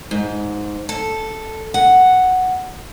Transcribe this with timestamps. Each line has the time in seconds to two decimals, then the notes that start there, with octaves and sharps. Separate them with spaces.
0.11 G#2
0.89 A4
1.74 F#5